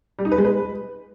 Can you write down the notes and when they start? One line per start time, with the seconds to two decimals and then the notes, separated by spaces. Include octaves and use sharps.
0.19 G3
0.25 D#4
0.32 B4
0.38 G#3
0.45 B4